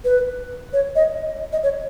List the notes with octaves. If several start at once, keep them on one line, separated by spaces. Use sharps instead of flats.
B4
C#5
D#5
D#5
C#5